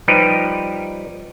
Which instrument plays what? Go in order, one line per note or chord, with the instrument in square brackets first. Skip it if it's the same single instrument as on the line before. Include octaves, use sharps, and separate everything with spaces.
[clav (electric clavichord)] F3 G3 D#4 G4 B4